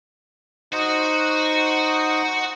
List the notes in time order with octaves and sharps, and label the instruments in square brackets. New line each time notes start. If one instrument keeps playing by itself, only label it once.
[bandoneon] D#4 C5 D#5 [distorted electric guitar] F#4